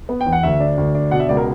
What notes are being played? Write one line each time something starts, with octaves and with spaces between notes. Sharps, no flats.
B3
G5
E2
F#5
D2 E5
D4
D2
D4
B2 F#5
E5
C#2 D5
A#4